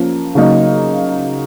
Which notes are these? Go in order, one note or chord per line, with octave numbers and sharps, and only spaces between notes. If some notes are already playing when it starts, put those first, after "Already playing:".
Already playing: F3 A#3 C#4
C#3 F#3 A#3 D#4